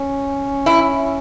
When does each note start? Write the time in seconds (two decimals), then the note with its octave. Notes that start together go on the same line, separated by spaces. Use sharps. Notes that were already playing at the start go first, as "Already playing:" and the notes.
Already playing: C#4
0.66 E4